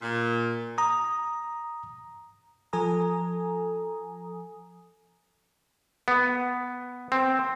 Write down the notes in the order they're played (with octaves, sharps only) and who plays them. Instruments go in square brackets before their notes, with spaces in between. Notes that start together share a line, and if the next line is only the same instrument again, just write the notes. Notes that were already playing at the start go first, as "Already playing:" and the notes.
[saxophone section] A#2
[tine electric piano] A#5 D#6
[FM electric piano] F3 A4 G#5 A#5 D#6
[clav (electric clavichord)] B3
C4